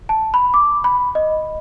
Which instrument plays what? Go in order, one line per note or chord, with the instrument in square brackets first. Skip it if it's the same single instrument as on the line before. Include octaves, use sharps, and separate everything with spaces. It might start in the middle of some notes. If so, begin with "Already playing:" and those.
[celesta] A5
B5
D6
B5
D#5